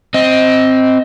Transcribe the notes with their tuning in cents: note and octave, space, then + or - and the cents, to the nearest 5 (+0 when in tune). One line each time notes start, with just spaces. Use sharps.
C4 +0 D#5 +15